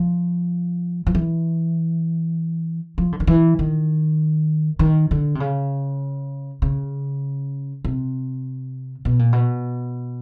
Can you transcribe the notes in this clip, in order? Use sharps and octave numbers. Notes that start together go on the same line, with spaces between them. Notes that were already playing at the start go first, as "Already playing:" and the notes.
Already playing: F3
F3
E3
F3
D3
D#3
E3
D#3
D#3
D3
C3
C#3
C#3
C3
B2
A#2
B2